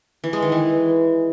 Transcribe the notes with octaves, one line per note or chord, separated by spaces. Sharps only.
E3
G#3
D#3
E3